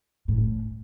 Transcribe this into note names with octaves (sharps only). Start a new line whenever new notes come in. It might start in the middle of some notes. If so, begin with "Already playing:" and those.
A2